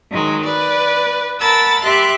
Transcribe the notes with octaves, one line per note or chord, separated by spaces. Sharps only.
D#3 F#3 G#3
B4 D5
A#4 F#5 A5 B5 E6 A6
G4 E5 C6 F#6